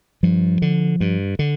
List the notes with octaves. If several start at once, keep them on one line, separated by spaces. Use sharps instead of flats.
G2 F3
D3
G2
D3